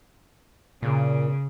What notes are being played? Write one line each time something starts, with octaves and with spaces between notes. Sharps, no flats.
A#2 C#3